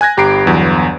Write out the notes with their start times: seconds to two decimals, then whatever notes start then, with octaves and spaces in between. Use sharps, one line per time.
0.01 G#5 F#6 G#6 A#6
0.17 G1 G4 A#5 B5 C7 D7
0.45 G1 E2 F#3